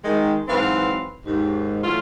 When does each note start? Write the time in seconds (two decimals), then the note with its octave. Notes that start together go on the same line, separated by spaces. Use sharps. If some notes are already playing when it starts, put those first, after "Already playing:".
0.03 D#3 G#3
0.48 G#2 E3 F#3 C4 B4 F5
1.25 D#2 G#2
1.83 E3 F#3 A3 E4 F4